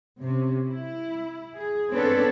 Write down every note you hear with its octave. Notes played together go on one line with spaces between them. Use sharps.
C3 C#4
E4
G#4
B3 C4 D4 A4 B4 C#5